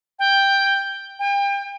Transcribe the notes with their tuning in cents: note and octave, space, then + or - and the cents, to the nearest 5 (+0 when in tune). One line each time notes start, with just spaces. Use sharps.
G5 +5
G5 +35